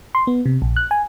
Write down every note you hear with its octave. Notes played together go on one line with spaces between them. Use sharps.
C6
B3
C3
A#1
F#6
G#5